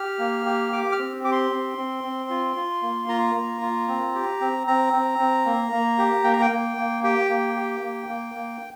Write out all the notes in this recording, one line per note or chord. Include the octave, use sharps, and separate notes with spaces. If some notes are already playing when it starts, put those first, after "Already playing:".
Already playing: G4 F6
A#3
G4
G4 D6
F6
C4
G4 D6
C6
C4
C4
C4
F4
F4
A#3
F4 A#5
A#3
F4
C4
G4
C4
C4 A#5
C4
C4
A#3
A#3
G4
A#3 G5
A#5
G5
A#3
A#3
G4 G5
A#3
G4
A#3
A#3
A#3